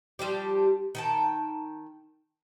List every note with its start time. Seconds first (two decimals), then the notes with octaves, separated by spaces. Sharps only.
0.19 F3 G3 D4 G4
0.95 D#3 G5 A5